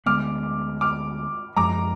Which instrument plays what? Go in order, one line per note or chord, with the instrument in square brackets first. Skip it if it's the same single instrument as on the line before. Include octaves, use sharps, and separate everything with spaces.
[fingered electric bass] D2 D3 G#3 B3 [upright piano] D6 F6
[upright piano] D6 F6
[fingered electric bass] F#2 F3 G#3 [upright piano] A#5 D6